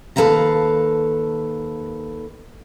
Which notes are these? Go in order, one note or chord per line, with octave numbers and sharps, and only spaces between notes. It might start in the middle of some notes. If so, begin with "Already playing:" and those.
D#2 G#2 A4 B4 F5 A#5